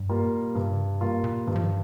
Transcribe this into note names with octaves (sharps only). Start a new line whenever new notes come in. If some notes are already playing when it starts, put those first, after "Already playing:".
Already playing: G2
G3 A#3 F4
A#2
G2 C3
C#3
C3
G#2 G3 A#3 F4
A#2
G2 D#3
F3
D#3